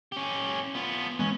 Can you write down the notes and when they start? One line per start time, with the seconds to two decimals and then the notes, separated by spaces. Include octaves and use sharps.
0.12 C#4 G4
0.75 B3 F4
1.19 E3 G#3 B3 C#4